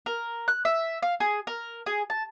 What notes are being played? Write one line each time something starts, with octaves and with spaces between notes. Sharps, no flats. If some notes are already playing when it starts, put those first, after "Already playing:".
A#4
F#6
E5
F5
G#4
A#4
G#4
A5